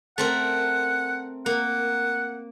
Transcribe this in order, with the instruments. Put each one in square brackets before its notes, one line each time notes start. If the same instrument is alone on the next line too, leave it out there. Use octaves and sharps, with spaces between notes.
[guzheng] A3 C4 A#4 [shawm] F#5
[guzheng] A#3 [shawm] F#5